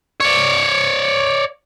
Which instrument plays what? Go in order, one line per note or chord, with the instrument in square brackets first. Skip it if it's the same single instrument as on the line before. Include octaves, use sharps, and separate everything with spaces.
[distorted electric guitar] C#5 D5